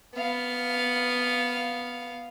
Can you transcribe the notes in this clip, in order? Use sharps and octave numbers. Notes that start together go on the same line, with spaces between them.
B3 F5